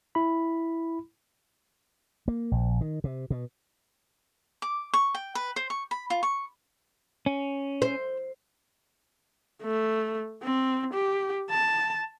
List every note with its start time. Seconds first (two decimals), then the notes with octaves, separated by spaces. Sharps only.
0.15 E4 B5
2.28 A#3
2.51 A#1
2.81 D#3
3.04 C3
3.30 B2
4.62 D6
4.93 C#6
5.14 G5
5.35 B4
5.56 C5
5.70 C#6
5.91 B5
6.10 F4
6.23 C#6
7.26 C#4
7.82 C5
9.63 A3
10.43 C4
10.94 G4
11.50 A5